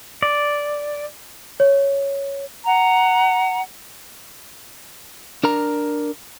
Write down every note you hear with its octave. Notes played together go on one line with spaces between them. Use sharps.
D5
C#5
F#5 A#5
D4 A#4 A#5